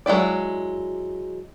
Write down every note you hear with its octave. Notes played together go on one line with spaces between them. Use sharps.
F#3 G#3 E4 D5